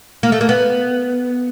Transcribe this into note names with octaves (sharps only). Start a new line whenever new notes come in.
A#3
A3
A#3
B3